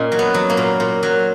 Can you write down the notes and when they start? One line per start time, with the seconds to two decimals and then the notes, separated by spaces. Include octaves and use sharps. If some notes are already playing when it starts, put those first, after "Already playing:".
Already playing: A#2 C#4 D#4
0.12 F#3
0.19 B3
0.34 F#3
0.50 A#3
0.57 A#2
0.80 A#2
1.03 F#3